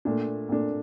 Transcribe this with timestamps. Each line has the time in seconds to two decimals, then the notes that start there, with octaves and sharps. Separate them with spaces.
0.05 A#2 A3 D4
0.49 A#2 A3 D4